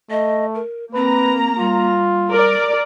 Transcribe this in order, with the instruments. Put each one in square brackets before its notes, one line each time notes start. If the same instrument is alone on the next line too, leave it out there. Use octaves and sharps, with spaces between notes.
[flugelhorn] A3 [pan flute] D#5
[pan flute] A#4
[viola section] A#3 A#5 [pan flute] C4 [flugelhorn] B4
[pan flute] G3 [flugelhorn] F4
[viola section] A#4 D5